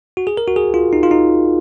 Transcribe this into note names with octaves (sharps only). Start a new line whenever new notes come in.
F#4
G#4
A#4
F#4
G#4
F4
D#4
F4
D#4